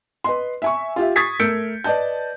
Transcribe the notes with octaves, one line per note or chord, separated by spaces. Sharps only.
B4 D#5 C6
E5 G#5 C#6
F4 G4 E5
C#6 D#6 G#6 A6 B6 C7
A3 A#4 E6 G6 C#7 D7
B4 D5 D#5 A5 G6